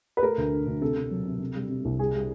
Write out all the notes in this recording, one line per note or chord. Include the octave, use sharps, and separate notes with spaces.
B4
A3 A#4
D2
D3
D2
C3 A4
C3
F#3
C3
C3
G3
C3
C2
G3 G#4
G3